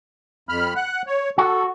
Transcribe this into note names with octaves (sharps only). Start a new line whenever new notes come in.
F2 B5 F6
F#5 F#6
C#5
F#4 A4